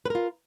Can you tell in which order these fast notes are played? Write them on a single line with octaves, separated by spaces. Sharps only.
B4 A#4 F4